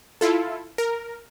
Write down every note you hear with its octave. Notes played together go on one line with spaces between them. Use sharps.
E4 F4 A4
A#4